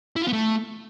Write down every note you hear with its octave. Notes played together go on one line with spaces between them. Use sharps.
E4
F4
B3
A3